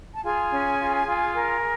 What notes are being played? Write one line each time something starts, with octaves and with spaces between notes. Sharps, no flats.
A5
F4 G#4 G#5
C#4
F4
F4
A#4